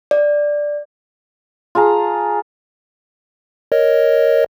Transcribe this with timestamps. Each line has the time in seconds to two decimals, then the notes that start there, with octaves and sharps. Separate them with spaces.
0.11 D5
1.75 F4 G#4 A5 A#5
3.72 A#4 C#5 D#5